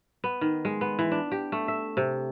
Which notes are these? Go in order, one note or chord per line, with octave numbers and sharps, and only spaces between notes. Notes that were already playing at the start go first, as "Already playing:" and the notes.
B3
D#3
G#3
B3
E3
D4
G4
A3
E5
C3